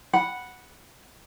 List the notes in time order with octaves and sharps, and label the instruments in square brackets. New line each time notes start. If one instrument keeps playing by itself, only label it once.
[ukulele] F#5 B5